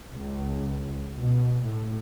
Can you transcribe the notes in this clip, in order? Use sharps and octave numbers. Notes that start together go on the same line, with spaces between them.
C#2
B2
A2